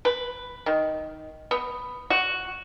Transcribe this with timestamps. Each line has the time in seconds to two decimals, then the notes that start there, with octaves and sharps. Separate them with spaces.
0.05 B4
0.66 D#3
1.51 B3
2.10 F#4